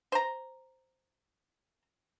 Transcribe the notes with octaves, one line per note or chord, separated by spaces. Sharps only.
C5 A#5